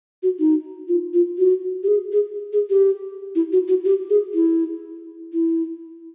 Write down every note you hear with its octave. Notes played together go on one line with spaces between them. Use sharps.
F#4
D#4
F4
F4
F#4
G4
G#4
G#4
G#4
G4
E4
F#4
F#4
G4
G#4
E4
E4